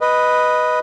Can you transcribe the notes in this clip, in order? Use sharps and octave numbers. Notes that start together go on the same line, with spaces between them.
B4 D#5